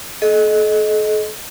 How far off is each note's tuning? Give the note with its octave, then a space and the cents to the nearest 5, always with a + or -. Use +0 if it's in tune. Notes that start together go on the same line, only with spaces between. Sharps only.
A4 -45 D#5 +0